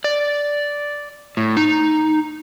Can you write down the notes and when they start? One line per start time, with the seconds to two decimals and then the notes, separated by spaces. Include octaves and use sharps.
0.04 D5
1.37 A2
1.57 D#4